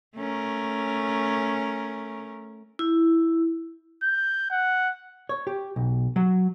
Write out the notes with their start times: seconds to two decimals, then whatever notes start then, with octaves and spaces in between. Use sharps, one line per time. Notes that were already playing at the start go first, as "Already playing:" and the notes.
0.16 A3 C#4 A#4
2.79 E4
4.03 G6
4.51 F#5
5.29 C#5
5.47 G4
5.76 B1
6.16 F#3